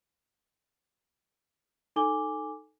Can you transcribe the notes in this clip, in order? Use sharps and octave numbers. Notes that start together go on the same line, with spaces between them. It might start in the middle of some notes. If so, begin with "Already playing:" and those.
D#4 A4 G#5 D6 G7